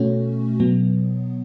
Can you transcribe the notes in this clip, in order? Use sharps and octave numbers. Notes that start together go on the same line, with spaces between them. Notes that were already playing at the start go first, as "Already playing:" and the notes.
Already playing: B2 A3 C#4 F#4
B2 F#3 B3